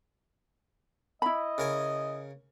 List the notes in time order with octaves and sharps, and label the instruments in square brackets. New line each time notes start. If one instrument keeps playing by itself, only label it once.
[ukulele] E4 B5 [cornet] D#5
[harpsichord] C#3 A#4 G#5